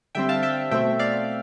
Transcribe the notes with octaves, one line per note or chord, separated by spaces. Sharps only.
D3 G3 C4 E5 G5
F5 A5
E5 G5
B2 A3 C4 E5 G5
D5 F5